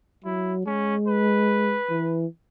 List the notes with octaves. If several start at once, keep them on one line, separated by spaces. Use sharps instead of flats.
F#3 E4
G#3 C#4
B4
E3